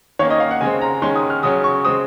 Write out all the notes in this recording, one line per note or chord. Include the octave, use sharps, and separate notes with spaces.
D#3 A#3 C#4 C#5
D#5
F5
F#5
C#3 G#3 C4 G#5
A#5
D#3 G#3 C#4 C6
D#6
F6
C#3 F#3 C#4 D#6
C#6
C#3 G#3 C4 D#6